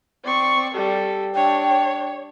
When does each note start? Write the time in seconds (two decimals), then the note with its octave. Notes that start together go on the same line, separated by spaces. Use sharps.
0.25 C4 D5 C#6
0.74 G3 A4
1.35 D4 C#5 G5